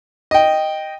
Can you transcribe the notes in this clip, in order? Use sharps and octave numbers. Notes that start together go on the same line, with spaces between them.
D#5 G5